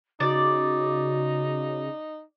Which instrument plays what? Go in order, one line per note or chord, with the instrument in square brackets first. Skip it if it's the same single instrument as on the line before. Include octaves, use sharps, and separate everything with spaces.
[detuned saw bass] C#3 [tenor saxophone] D#4 [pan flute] F#4 [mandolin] D5